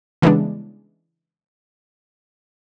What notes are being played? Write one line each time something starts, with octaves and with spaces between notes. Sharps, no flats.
C#3 E3 G3 G#3 B3 D4